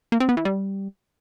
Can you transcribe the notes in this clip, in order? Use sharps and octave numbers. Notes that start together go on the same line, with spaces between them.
A#3
C4
B3
E3
G3